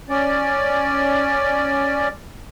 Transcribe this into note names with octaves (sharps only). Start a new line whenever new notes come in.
C#4 D5